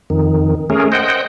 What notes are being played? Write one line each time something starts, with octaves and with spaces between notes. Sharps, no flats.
F2 D#3
A3 C#4 G#4 A#4
C5 D#5 F#5 G5